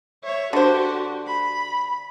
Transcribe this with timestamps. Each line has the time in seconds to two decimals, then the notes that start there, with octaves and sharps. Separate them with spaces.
0.24 C#5 E5
0.53 D3 F#4 G4 C5
1.26 B5